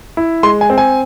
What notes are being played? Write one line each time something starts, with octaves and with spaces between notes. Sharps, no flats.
E4
G#3 C6
G#5
C4
G#5